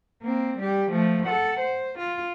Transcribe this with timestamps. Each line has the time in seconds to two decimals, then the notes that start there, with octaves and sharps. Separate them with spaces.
0.22 A#3 C4
0.59 G3 G4
0.91 F3 A3
1.26 A4 F#5
1.60 C5
1.99 F4